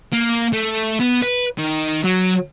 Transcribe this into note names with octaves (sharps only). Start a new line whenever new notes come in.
A#3
A3
B3
B4
D#3
F#3